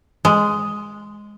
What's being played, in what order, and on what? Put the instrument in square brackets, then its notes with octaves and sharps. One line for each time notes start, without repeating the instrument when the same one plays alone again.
[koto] G#3